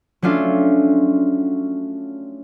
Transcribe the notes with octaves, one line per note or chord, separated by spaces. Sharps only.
F#3 A3 C#4 D4 F4